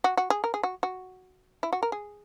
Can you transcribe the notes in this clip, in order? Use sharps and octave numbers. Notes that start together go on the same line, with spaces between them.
F#4
F#4
G#4
A#4
G#4
F#4
F#4
E4
F#4
A#4
G#4